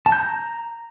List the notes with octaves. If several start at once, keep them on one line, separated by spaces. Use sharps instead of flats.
A5
G6
A#5